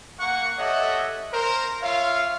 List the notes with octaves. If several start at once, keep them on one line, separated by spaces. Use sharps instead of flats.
A#3 F#5 C#6
G4 A4 C#5 D#5 E5 F#5
A#4 C5
F4 C#5 E5 F5